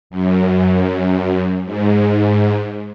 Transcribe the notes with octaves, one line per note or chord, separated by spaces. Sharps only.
F#2
G#2